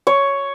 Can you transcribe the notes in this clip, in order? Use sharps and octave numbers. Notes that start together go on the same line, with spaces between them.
C#5